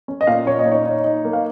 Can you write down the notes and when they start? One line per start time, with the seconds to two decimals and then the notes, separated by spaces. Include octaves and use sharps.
0.08 C#4
0.21 D#5
0.27 A#2 F5
0.46 A#2 C#5
0.59 D#5
0.66 D#4
0.72 C#5
0.86 D#4
1.04 D#4
1.25 A#3
1.33 F5